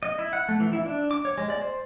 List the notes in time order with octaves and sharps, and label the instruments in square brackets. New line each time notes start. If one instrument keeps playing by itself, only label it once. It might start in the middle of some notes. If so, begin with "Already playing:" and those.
[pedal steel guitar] D#5
E4
F#5
A3
E3
E4
D4
D6
C#5
G#3
D5
C5